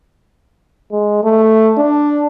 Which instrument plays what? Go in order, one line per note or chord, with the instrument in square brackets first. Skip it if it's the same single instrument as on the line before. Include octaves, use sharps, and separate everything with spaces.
[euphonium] G#3
A3
D4